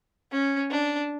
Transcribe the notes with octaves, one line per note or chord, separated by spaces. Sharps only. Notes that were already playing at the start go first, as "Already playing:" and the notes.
C#4
D4